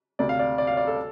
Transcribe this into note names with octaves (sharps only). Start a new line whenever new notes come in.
D2 C3 D5
F5
D5
D5
F5
D5
A4